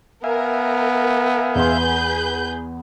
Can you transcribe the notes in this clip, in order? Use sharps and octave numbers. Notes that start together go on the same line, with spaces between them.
B3 A#4 E5 F5 G#5
E2 G#4 B4 C6 G6